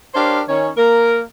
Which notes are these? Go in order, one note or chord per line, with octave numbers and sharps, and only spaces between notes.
D4 G4 A#4 C5 C#5 F5
D#3 C#4 C#5
A#3 A#4